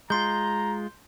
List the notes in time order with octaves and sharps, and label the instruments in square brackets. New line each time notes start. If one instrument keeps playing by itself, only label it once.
[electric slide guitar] G#3 F4 [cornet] A#5 [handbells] C6 G6